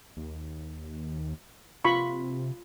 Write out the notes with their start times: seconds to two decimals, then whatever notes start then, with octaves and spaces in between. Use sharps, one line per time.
0.17 D#2
1.85 C3 F4 B5 C#6